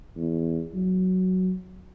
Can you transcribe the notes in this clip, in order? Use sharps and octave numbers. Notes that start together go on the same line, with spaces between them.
E2
F#3